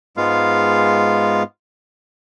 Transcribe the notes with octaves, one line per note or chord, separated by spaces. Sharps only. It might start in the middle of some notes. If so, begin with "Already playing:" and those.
G#2 G#3 B3 F4 F5